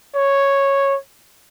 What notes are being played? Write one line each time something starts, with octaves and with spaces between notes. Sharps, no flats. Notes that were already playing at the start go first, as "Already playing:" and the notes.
C#5